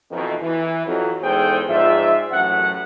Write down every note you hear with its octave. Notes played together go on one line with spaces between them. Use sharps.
F2 B2 D#3 E3
E3
F2 F#3
E2 G#2 G#4 A4 C5 G5
G#2 F3 F4 D5 E5
A1 F#2 A2 C3 F#5